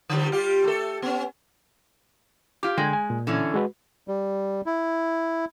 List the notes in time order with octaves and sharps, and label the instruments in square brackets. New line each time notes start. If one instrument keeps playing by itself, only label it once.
[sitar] D3 F3 G3
G3 F4 G4
A3 A4
B3 C#4
[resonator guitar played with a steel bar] F4 G4 [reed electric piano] D6
[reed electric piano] D3 G5 C6 [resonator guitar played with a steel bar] G#3
[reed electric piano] G#5
A#2
[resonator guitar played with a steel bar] D3 E3 C#4
[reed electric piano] G#3 F#4 B4
[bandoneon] G3
E4